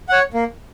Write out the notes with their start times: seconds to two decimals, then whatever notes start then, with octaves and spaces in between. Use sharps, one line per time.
0.09 C#5 F#5
0.34 A#3